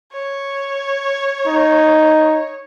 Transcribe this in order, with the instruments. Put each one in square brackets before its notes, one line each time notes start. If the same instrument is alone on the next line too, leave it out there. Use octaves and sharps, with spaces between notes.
[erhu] C#5
[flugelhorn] D#4